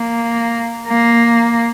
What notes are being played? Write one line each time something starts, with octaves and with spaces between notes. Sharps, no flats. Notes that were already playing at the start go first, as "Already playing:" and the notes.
Already playing: A#3
A#3